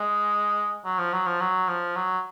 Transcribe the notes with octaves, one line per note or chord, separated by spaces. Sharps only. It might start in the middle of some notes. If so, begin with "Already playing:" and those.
Already playing: G#3
F#3
F3
F#3
F3
F#3
F3
F#3